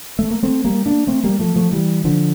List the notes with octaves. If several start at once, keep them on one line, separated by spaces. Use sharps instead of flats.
A3
A#3
A3 C4
G3 A#3
A#3 D4
A3 C4
G3 A#3
F3 A3
F3 A3
E3 G3
D3 F3